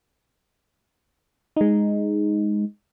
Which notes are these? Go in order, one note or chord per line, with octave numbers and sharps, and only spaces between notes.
G#3 D#4